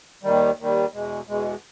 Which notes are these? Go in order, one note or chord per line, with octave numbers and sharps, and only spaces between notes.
D#2 D#3 G3
D#2 D#3 G3
E2 B2 G#3
E2 B2 G#3